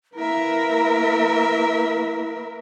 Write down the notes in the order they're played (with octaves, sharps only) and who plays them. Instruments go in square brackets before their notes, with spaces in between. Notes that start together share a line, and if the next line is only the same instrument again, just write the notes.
[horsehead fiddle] A#3 B4 [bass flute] E4 [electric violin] A#4 E5